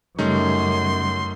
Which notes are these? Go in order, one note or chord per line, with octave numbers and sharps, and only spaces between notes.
F#2 C#3 G3 A3 C#4 D#4 C6